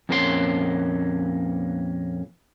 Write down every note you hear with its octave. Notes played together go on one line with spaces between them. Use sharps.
F2 A#2 A#3 C#4 G#4 C6